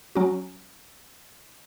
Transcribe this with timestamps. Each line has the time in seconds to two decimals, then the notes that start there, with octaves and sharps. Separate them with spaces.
0.15 F#3 C#4 F#4